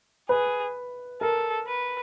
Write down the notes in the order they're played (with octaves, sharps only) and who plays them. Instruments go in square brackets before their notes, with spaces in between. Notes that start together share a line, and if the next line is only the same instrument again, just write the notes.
[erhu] G#4 [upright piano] B4
[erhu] A4 [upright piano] A#4
[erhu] B4